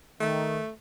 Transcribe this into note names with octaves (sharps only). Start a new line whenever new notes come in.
D#3 A3